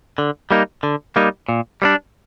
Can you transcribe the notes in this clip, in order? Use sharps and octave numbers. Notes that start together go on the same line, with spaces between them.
D3
G3 A#3 D#4
D3
G3 A#3 D#4
A#2
G3 B3 D4